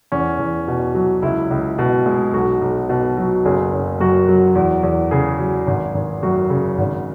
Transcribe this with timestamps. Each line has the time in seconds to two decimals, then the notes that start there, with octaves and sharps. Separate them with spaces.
0.12 E2 C#4
0.39 E2
0.68 B2
0.95 F#3
1.22 C#2 E4
1.51 C#2
1.78 B2
2.06 G#3
2.33 B1 F#4
2.62 B1
2.89 B2
3.17 F#3
3.45 F#1 G#4
3.73 F#1
4.00 F#2 F#4
4.29 F#3
4.55 E2
4.83 E2
5.11 C#3 G#4
5.40 F#3
5.67 G#1
5.94 G#1
6.23 F#2 F#4
6.50 C#3
6.78 G#1